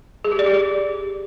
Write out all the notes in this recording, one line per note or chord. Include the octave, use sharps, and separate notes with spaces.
G#4
G4
D5
G4